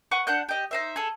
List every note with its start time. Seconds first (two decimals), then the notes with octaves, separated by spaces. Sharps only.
0.11 B4 F#5 C#6
0.27 D4 F#5 F#6 G6
0.49 G4 D#5
0.71 D#4 C5 E5
0.96 G#4 A4